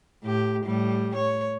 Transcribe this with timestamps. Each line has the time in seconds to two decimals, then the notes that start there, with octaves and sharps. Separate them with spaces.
0.23 A2 G4
0.64 A2 G3
1.15 C#5